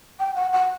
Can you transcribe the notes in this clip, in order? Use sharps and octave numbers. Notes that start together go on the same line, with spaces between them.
G5
F#5
F#5